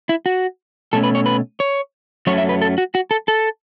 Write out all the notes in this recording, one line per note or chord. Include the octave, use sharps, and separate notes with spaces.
E4
F#4
B2 A3 C#4 A4
B4
C#5
B4
C#5
F#2 F#3 A3 C#4 C#5
E5
B4
A4
F#4
F#4
A4
A4